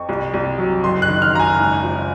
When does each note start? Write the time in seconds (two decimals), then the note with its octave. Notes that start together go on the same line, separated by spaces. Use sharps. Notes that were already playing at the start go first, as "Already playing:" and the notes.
Already playing: F2 C#6
0.09 C2
0.34 C2
0.58 F#3
0.84 F#1 C6
1.02 F#6
1.08 D#3
1.22 F6
1.34 F#1 A#5
1.39 G#5
1.59 G#1
1.84 F3